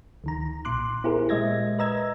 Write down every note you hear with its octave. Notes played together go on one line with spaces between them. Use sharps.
D2 D#3 A#5
B1 A#2 C6 D6 F#6
B3 E4 G4 G#4 A#4 C5
A#2 G#3 D#5 E5 G#6 A#6
B4 D#5 A#5 E6 G#6